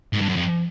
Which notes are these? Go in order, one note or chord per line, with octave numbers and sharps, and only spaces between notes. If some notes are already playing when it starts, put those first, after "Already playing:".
G#2
G2
F#2
F2